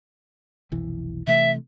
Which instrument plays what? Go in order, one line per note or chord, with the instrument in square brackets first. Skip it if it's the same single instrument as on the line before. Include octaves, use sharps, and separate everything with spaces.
[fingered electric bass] F1 B1 E3
[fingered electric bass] C3 E3 A3 [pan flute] E5